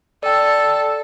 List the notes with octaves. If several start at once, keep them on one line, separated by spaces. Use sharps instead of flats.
A4 D5 G5